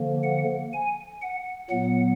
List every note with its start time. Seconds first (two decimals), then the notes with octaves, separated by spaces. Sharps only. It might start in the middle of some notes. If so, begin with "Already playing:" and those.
Already playing: D3 F3 A#3
0.24 F#5
0.73 G#5
1.22 F#5
1.70 A#2 F#3 B3 F#5